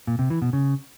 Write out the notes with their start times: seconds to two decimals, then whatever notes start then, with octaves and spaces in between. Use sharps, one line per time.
0.07 A#2
0.19 C3
0.30 E3
0.42 B2
0.53 C#3